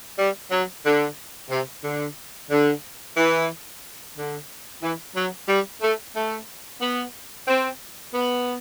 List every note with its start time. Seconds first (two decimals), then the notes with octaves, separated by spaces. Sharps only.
0.18 G3
0.51 F#3
0.84 D3
1.50 C3
1.84 D3
2.50 D3
3.17 E3
4.16 D3
4.82 E3
5.15 F#3
5.48 G3
5.82 A3
6.15 A3
6.80 B3
7.47 C4
8.13 B3